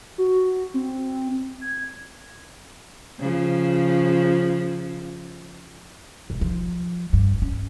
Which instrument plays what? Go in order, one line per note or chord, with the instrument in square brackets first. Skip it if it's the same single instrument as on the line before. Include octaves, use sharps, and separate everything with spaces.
[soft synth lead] F#4
C4
G#6
[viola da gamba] C#3 F3
[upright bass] E1
F3
G2
C#4